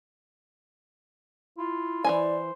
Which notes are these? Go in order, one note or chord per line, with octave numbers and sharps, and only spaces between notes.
E4 F4
E3 F3 C5 D5 G#5